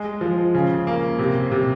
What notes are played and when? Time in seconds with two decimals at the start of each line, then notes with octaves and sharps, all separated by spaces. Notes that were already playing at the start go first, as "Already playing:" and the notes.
Already playing: G#3
0.21 F3
0.54 C#3
0.87 A#3
1.19 C3
1.52 C3